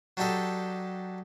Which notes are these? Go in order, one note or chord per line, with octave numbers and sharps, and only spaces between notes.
F#3 D4 D#4 G4 A4 D#5